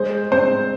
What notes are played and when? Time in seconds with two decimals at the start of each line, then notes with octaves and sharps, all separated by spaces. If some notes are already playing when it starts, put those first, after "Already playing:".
Already playing: G#3 C5
0.31 C4 C5